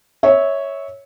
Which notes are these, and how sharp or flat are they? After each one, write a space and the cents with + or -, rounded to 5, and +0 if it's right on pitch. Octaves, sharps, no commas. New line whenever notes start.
C#5 +0 E5 -20